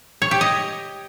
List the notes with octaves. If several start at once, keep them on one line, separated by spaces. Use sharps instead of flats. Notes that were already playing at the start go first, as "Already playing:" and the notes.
C#5
G4
D#5